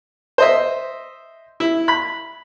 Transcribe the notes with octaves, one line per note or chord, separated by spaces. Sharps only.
C5 D#5 E5
E4
B5